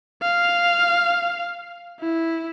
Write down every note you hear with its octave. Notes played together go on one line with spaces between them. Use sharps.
F5
E4